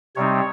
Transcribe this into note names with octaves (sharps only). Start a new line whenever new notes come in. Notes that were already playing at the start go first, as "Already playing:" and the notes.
C3 G3 C4 D#4 C#5